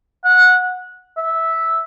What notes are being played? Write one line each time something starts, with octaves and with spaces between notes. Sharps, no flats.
F#5
E5